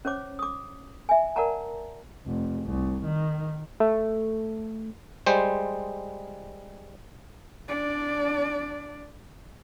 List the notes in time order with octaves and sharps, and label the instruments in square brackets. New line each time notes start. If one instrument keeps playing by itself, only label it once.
[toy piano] C#4 C5 C#5 D6
D6 D#6
E5 G#5
A#4 D5 F#5 A5 A#5
[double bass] F1
C2
D#3
[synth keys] A3
[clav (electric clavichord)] G3 G#3 C5
[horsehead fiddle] D4 D5